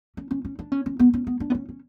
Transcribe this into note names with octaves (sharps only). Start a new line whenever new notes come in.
C#4
C#4
C#4
D4
C#4
C#4
B3
C#4
B3
D4
B3
C#4
C#4